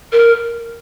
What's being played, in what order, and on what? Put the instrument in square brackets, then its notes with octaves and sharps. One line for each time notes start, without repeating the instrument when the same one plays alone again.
[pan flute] A#4